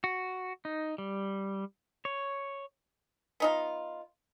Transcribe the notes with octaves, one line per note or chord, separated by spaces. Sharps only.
F#4
D#4
G3
C#5
B3 D#4 F4